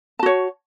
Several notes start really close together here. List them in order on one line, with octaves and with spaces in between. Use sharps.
A5 F#4 C#5